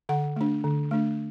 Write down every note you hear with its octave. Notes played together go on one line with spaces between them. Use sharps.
D3 F#5
A3 D4
D3
A3 D4